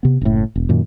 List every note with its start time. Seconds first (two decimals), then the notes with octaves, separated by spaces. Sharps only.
0.03 C3 B3
0.21 F#1 A2
0.56 E1
0.69 F#2 A#2 D#3